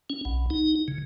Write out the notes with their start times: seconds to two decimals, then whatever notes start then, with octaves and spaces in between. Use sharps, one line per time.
0.10 C#4
0.25 B1
0.50 D#4
0.88 C#3